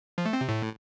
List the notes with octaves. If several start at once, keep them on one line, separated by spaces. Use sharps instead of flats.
F3
A3
C4
C3
A2